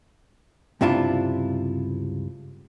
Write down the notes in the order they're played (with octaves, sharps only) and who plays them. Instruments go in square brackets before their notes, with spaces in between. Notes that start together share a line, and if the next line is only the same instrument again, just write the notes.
[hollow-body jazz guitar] C#2 G2 C3 D4 E4 F4